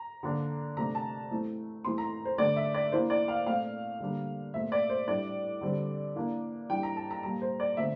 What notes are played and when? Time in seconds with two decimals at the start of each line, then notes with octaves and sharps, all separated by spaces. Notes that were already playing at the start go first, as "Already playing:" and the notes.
Already playing: A#5
0.23 D3 F3 A#3 D4
0.77 C3 F3 A3 D4 A#5
0.95 A5
1.31 E3 A3 C4
1.84 E3 A3 C4 C6
1.98 A#5
2.25 C5
2.38 D3 A3 D4 D5
2.56 E5
2.74 D5
2.92 E3 A#3 D4 C5
3.10 D5
3.28 F5
3.46 A#2 A3 C4 F5
4.00 D3 G3 A#3 D4
4.54 A#2 A3 C4 E5
4.72 D5
4.90 C5
5.08 A2 G3 D4 D5
5.61 D3 G3 C4
6.16 E3 A#3 D4
6.70 E3 G3 D4 G5
6.83 A#5
6.97 A5
7.11 A#5
7.23 A#2 G3 A#3 A#5
7.42 C5
7.60 D5
7.77 D3 F3 A3 C4 E5